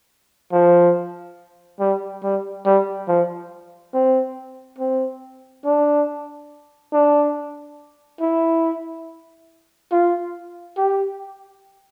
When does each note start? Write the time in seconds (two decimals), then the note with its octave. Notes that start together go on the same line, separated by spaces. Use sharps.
0.52 F3
1.80 G3
2.23 G3
2.65 G3
3.08 F3
3.94 C4
4.79 C4
5.65 D4
6.93 D4
8.21 E4
9.92 F4
10.77 G4